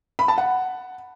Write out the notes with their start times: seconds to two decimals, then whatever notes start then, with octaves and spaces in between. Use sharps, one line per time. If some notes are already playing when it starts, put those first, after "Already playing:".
0.19 B5
0.28 A5
0.38 F#5